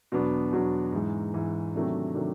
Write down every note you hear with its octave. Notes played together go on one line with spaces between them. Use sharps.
E2 B2 F#3 B3 D4
E2 B2 F#3 B3 D4
G#2 E3 G#3
G#2 E3 G#3
C3 D#3 F#3 A3 D4
C3 D#3 F#3 A3 D4